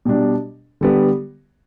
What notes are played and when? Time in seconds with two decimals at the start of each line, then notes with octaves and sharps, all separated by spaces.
0.05 B2 G3 D4
0.81 D3 G3 B3